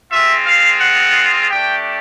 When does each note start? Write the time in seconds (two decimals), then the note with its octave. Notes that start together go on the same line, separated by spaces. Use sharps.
0.11 G#3 C4 F4 E5
0.46 F5
0.80 F#5
1.50 A3 D4 G4 G5